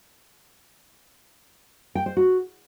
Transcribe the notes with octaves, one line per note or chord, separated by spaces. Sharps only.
G5
C5
F#4